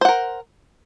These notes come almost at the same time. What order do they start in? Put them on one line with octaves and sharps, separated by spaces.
C5 F#5 A#4